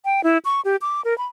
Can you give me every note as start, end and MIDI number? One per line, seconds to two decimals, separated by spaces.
0.05 0.23 79
0.24 0.38 64
0.45 0.61 85
0.65 0.76 67
0.82 1.01 86
1.05 1.17 70
1.18 1.26 83